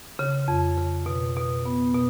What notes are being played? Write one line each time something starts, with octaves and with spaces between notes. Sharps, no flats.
C#3
F2
C#3
B2
B2
B3
B2